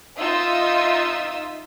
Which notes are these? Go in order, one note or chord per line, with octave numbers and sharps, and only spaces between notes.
D#4 F4 E5 D#6 E6